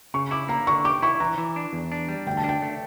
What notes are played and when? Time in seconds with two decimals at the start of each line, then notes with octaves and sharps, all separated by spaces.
0.14 C#3 C#6
0.31 E4 D6
0.48 A#3 A#5
0.67 D3 C#6
0.85 G4 D6
1.02 E4 C#6
1.20 E3 A#5
1.38 E3
1.56 D4
1.73 E2
1.92 D4
2.08 G3
2.27 D2 G5
2.37 A5
2.44 D4 G5
2.62 A3